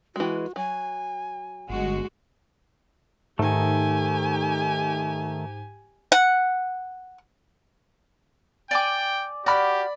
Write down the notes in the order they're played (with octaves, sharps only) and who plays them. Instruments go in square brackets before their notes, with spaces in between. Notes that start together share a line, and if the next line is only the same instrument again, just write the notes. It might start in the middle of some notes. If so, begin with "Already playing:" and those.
[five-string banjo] E3 G#3 [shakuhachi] F#4
[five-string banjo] F#3 [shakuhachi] G#5
[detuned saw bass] G1 [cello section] G#3 F#4
[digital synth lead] G#2 [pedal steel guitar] D#3 A3 [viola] G4 G#5
[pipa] F#5
[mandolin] D5 G#5 D6 [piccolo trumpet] G5
[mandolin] F#4 F6 [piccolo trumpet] G4 [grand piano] D5 B5